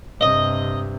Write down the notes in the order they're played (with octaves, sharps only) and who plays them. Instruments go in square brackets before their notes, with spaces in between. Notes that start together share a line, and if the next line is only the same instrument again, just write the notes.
[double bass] G2 C3 [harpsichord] D#5